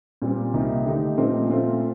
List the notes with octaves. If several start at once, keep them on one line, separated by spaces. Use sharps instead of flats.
A#2 G3 C4 G4
C2 C3 D#3 A#3 D#4
D3 A3 D#4 G4
A#2 F3 A3 C4 D#4
A#2 A3 C4 F4